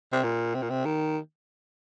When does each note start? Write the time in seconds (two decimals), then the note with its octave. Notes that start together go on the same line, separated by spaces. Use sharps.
0.12 C3
0.24 A#2
0.55 C3
0.62 A#2
0.70 C3
0.85 D#3